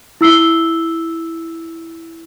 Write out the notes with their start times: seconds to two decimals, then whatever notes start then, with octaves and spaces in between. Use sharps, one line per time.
0.21 E4 E6 C7 G7